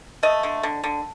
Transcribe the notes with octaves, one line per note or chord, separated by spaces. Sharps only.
A3 D#5
D3
D3
D3